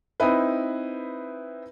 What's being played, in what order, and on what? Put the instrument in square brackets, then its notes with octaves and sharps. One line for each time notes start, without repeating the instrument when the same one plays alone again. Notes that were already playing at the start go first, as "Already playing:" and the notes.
[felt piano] C4 D#4 E4 B4